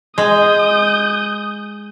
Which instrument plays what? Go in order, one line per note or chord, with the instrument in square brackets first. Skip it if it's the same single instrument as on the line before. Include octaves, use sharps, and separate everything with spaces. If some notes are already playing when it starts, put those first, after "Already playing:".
[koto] G#3 [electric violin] D#6 G6